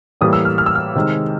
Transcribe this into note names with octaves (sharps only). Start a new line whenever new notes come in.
A2 E3 G3 A#3 D#6
E6
F6
F6
E6
F6
C3 D#3 G#3